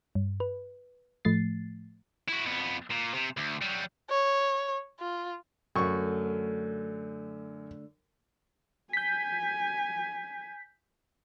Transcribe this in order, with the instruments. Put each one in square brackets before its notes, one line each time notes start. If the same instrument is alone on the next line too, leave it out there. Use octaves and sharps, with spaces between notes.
[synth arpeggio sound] G2
B4
A2 F3 A3 A6 C7
[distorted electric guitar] E4 F#4
F2 B3
A#2
C3
D2
F#3 G3
[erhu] C#5
F4
[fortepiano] F#2 C#6 [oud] D3 A3
[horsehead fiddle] G#5 [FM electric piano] G6 B6